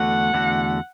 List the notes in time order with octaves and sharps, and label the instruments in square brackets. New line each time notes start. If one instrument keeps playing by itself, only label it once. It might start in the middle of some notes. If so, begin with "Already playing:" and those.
Already playing: [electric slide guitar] E2 D3 A3 F#4 [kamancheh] F#5
[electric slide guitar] E2 D3 A3 F#4